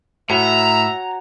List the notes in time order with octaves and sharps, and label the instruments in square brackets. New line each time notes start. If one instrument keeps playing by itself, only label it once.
[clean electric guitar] A2 [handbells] F#4 C#5 F#5 [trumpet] E5 [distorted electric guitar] A#5